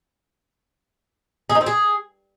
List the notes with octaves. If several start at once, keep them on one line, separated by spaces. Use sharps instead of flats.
G#4
D#4
C4
G#4